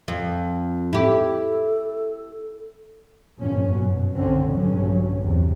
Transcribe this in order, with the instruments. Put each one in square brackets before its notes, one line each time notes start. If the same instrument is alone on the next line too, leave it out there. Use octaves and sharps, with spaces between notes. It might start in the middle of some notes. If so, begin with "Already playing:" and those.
[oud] F2
[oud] E4 G4 [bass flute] A4
[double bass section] G1 F2 A#2 F3 C#4
F#2 B2 F#3
B1 D3 D#3 C4 C#4
A#1 G2 D3 F#3 C#4
E2 C3